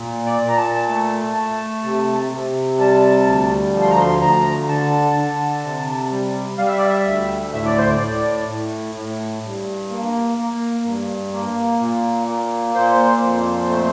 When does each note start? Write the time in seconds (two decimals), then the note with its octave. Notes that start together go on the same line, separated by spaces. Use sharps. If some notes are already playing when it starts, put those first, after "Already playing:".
Already playing: A#2
0.26 D5
0.42 A#2
0.48 A#5
0.58 A5
0.89 A3
1.37 A3
1.84 C3
2.32 C3
2.79 G3 A5
3.27 D2
3.74 F3
3.82 C6
3.90 A#5
3.99 C6
4.21 D2 A#5
4.68 D3 A5
5.16 D3
5.64 C3
6.11 G3
6.58 G3 F5
6.68 E5
6.78 D5
6.88 E5
7.06 D2
7.53 A2 E5
7.66 D5
7.78 C5
7.90 D5
8.01 A2
8.48 A2
8.95 A2
9.43 G2
9.90 A#3
10.38 A#3
10.85 G2
11.32 A#3
11.80 A#2
12.28 A#3
12.75 A#2 C5
13.22 F2
13.70 A3